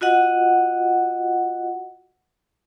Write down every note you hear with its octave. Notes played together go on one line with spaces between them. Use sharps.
F4 F#4 D#5 F#5